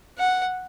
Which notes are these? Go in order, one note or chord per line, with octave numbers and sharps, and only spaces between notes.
F#5